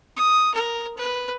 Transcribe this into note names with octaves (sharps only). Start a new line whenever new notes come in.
D#6
A#4
B4